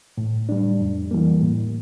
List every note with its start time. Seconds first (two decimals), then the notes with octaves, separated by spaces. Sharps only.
0.18 A2
0.49 G3 D4
0.80 F2
1.11 E3 G3 A#3
1.42 A2